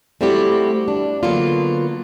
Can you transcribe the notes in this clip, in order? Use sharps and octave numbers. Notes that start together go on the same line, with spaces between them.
G3 A3 C4 E4 F#4 G4
D4
D3 F#3 A#3 B3 F4